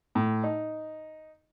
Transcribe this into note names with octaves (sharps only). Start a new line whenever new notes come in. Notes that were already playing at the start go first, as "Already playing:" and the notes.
A2
D#4